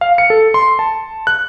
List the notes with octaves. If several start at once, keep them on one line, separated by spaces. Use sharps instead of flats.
F5
C#7
A4
C6
A5
F#6